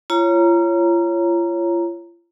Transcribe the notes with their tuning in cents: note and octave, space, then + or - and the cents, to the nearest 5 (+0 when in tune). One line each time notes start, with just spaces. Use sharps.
F4 -35 C#5 +0 A#5 +0